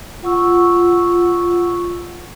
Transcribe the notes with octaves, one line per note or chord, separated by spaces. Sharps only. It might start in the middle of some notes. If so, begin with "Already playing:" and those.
F4 F#5 C#6 E6